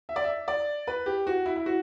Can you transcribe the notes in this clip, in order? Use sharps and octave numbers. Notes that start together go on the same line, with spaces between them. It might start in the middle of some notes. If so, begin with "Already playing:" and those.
E5
D5
E5
D5
B4
G4
F#4
E4
E4
F#4